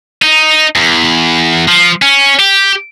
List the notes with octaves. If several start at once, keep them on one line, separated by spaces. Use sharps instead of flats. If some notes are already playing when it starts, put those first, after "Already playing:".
D#4
E2
F3
C#4
G4